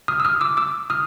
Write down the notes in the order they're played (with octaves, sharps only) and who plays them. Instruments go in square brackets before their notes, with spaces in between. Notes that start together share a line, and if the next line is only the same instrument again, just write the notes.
[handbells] D#6 F6
E6
D#6 F6
D6 E6
D6 E6
D#6 F6